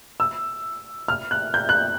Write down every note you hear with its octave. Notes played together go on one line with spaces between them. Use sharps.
E6
F6
F#6
G6
F#6